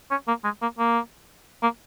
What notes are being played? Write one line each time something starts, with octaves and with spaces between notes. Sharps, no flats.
C#4
A#3
G#3
A#3
A#3
A#3